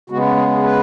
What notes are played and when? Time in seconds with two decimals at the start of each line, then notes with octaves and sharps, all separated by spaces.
0.10 C#3 G#3 B3 F#4
0.36 G#4
0.63 B4